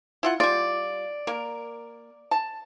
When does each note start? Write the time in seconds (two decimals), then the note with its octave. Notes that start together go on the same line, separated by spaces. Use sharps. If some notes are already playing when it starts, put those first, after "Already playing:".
0.23 E4 F4 F#5
0.40 G3 F4 D5
1.27 A#3 A#4
2.31 A5